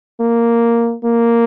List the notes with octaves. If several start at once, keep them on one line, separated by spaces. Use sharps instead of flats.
A#3
A#3